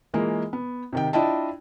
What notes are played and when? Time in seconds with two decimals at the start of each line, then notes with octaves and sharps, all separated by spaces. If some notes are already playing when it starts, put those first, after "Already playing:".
0.14 E3 G#3 A#3 F4
0.53 B3
0.93 C3 D#3 G5
1.13 D4 E4 F4 D#5 G5 A5